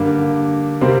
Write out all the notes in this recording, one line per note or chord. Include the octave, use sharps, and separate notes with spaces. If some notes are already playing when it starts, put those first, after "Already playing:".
Already playing: G2 D3 G3 A#3
C3 G3 A#3 C4